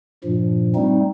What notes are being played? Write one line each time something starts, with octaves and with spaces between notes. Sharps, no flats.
G2 A#2 F3
G3 A3 C4 D#4